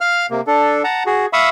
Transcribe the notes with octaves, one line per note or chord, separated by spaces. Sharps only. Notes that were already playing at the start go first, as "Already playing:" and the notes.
F5 F6
C3 A#3
D4 A4
F#5 A5 A#5
F#4 G#4
E5 F5 B5 C#6 D#6 E6